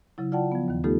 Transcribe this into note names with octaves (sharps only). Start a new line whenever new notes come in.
C#3 F#3 E4
F4 D5 F#5 G5 A5
F3 B3
D#2 D#3
A3 B3 D#4 F4 G4 A4